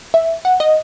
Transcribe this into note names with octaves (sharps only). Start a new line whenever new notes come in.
E5
F#5
D#5